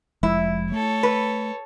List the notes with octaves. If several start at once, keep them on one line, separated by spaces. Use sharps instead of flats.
F1 F3 G#3 E4
A3 A4 C#5
B4